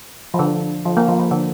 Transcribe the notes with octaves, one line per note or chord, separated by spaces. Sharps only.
F3
D3
F3
A#3
F3
F3
D3